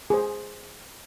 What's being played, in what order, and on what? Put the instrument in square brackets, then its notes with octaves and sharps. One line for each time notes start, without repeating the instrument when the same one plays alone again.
[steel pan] G#4 C5